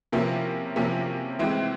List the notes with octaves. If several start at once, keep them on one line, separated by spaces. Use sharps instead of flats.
C3 F3 A#3 C#4 E4
C3 F3 A#3 C#4 E4
A2 E3 G#3 C4 E4